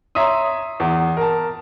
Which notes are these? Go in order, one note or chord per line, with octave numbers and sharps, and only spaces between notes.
C#5 E5 A#5 C6 D#6
E2
A#4 A5